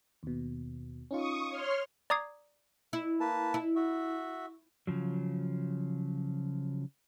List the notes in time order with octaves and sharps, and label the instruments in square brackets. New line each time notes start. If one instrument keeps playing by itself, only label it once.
[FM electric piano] D#2 B2
[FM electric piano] C#4 D#4 F4 [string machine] C#6 D#6
[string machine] C#5 C6 F6
[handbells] D5 A#5 D6 D#6 G#6 C7
[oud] E4
[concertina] A#3 B4 A5
[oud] E4
[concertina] F#4 E5
[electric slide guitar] C#3 F3 F#3